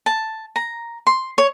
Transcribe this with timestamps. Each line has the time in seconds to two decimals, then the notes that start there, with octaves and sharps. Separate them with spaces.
0.06 A5
0.56 A#5
1.07 C6
1.38 C#5